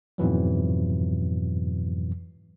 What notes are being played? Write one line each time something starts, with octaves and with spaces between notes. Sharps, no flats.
F2 G#2 B2 E3 F#3